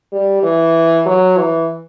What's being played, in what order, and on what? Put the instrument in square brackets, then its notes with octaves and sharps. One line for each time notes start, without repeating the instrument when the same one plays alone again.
[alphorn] G3
E3
F#3
E3